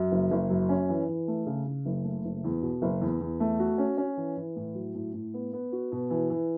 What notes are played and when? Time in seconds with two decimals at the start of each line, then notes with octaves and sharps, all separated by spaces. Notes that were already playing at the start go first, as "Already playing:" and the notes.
Already playing: F#2
0.12 F#1
0.31 F#1
0.50 F#2
0.69 C#4
0.89 E3
1.08 E3
1.28 A3
1.46 C#3
1.66 C#3
1.85 F#1
2.05 A3
2.25 F#1
2.44 E2
2.62 B2
2.82 F#1
3.01 E2
3.20 E2
3.40 A3
3.59 F#4
3.78 C#4
3.97 C#4
4.17 E3
4.37 E3
4.56 A2
4.75 F#3
4.95 A2
5.13 A2
5.34 B3
5.53 B3
5.72 F#4
5.92 B2
6.10 E3
6.30 E3